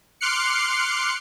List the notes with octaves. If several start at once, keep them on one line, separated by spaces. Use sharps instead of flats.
C6 D6 F6 F#6 C7 C#7